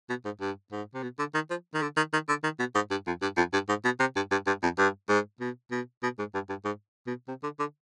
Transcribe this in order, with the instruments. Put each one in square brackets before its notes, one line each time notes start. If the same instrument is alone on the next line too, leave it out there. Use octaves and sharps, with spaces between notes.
[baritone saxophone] B2
G#2
G2
G#2
C3
B2
D3
D#3
F3
D#3
D3
D#3
D#3
D3
D#3
B2
G#2
G2
F2
G2
F2
G2
G#2
B2
C3
G2
G2
G2
F2
G2
G#2
B2
B2
B2
G#2
G2
G2
G#2
B2
C3
D3
D3